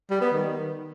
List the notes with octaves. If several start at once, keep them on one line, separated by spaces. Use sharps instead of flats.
G3
B3
D#3